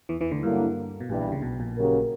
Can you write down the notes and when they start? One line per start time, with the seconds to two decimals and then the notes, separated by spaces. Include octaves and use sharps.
0.09 E2 E3
0.21 E2 E3
0.31 D2 D3
0.43 G2 D3 F#3 A#3 E4
1.00 B2
1.09 A#1 G2 A#2 E3 G3
1.21 B1 B2
1.32 C#2 C#3
1.42 B1 B2
1.59 A#1 A#2
1.76 C#3 F#3 C#4 G4 A#4